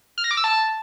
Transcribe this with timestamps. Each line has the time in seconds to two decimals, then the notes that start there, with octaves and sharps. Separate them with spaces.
0.18 F6
0.24 A#6
0.31 D6
0.37 E6
0.44 A5